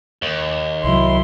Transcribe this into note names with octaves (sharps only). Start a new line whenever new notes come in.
D#2
C2 F#3 E4 C6